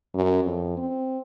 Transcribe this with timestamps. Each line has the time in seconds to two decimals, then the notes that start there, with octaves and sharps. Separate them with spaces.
0.14 F#2
0.44 F2
0.78 C4